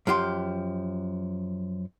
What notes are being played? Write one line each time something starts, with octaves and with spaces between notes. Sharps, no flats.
F#2 F3 G4 C6